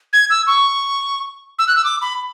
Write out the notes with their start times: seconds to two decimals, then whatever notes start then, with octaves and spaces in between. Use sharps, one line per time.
0.13 G#6
0.30 E6
0.47 C#6
1.59 E6
1.68 F#6
1.76 E6
1.84 D6
2.02 B5